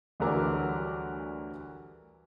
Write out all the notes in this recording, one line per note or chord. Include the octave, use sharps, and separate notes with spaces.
D2 E3 F#3 G3 A#4 D6